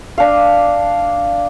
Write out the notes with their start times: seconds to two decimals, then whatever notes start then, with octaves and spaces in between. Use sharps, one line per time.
0.18 D4 F5